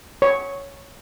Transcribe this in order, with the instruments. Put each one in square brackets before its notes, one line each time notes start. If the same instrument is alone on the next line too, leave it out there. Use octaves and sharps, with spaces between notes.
[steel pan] C#5